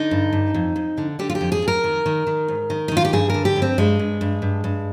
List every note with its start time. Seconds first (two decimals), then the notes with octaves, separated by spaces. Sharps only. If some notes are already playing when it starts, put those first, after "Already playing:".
Already playing: D3 D#4
0.11 G2
0.33 G2
0.54 F2
0.76 F2
0.98 D3
1.19 D3 G4
1.30 F4
1.35 G4
1.41 F2
1.52 G#4
1.62 F2
1.68 A#4
1.84 D#3
2.06 D#3
2.27 D#3
2.48 G#2
2.70 D#3
2.88 D#4
2.92 D#3
2.97 F4
3.05 G4
3.13 G2 G#4
3.30 D3 A#4
3.45 G4
3.56 G2
3.62 C4
3.78 G2 G#3
3.99 G2
4.21 G2
4.42 G2
4.64 G2